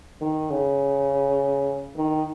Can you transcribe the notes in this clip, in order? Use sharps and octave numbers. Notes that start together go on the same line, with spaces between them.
D#3
C#3
D#3